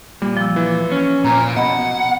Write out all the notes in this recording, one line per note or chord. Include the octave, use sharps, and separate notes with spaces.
A#2 G3
F3 E6
E3
C#4
A#2 A#5
B2 D#5 F#5 B5